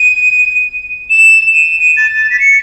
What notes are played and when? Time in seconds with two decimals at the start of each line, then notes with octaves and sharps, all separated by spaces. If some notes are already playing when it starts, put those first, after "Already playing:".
Already playing: D#7
1.10 E7
1.54 D#7
1.66 E7
1.79 D#7
1.97 A6
2.31 B6
2.40 C#7